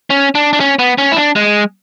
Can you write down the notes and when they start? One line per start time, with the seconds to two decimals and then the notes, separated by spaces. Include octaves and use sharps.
0.10 C#4
0.35 D4
0.53 D4
0.60 C#4
0.79 B3
0.98 C#4
1.12 E4
1.16 D4
1.36 G#3